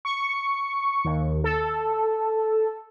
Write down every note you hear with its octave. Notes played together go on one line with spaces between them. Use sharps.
C#6
D#2
A4